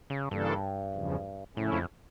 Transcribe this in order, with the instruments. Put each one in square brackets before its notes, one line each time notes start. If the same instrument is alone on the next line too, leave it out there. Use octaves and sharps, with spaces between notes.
[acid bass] C#3
[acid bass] G2 [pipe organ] C#3 E3 A#3 D4 A4
[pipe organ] E2 C#3 F3
[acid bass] A2 [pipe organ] C#3 F3 A3 C#4 E4
[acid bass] F2